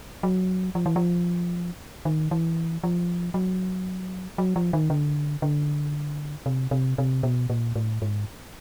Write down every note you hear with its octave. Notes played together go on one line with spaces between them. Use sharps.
F#3
F3
E3
F3
D#3
E3
F3
F#3
F#3
F3
D#3
D3
D3
C3
C3
C3
B2
A#2
A2
G#2